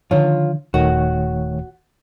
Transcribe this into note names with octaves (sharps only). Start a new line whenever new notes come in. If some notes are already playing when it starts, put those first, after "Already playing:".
D3 D#3 F3 F4 C#5
D#1 D#3 A3 F#4 C#5